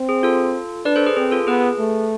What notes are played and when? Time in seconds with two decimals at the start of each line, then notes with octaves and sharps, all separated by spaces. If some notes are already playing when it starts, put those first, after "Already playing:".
Already playing: C4
0.09 G#4
0.23 F4 A4
0.85 D4 B4 D5
0.96 A4 C5
1.06 G#4 B4
1.16 C4 G#4
1.31 F4 A4
1.47 B3 G#4 B4
1.79 A3